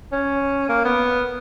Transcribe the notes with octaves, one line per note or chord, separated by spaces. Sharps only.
C#4
A#3
B3